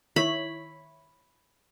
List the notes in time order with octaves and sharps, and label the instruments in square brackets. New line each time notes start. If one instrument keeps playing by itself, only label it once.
[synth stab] D#3 E4 C#5 [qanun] B5